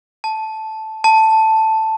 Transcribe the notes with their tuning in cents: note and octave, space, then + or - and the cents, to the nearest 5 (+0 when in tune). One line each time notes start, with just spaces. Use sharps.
A5 -5
A5 +5